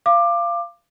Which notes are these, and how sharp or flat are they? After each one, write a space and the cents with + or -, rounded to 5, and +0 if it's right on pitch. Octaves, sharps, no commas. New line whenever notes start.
F5 -20 D6 +15